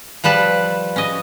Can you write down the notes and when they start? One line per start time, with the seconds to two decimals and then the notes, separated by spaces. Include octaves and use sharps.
0.24 F3 G3 B4 A5
0.96 C#4 D#5